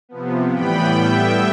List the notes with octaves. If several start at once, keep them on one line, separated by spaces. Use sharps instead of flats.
C3 F3 B3
A2 E3 G3 B3 G5 B5
A2 G3 B3 E5 G5